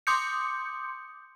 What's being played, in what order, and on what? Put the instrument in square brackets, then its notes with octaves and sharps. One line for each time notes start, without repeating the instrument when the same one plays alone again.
[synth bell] C6 D6 D#6 G6 C#7